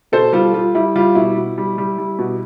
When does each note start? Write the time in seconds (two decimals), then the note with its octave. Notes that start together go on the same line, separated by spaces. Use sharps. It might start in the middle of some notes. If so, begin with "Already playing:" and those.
0.12 B2 A4 C5
0.33 G3 F4 A4
0.54 G3 F4
0.75 G3 E4
0.96 G3 F4
1.15 B2 E4
1.37 B2
1.58 G3
1.78 G3
1.98 G3
2.19 B2